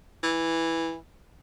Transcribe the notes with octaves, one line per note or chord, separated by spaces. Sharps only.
E3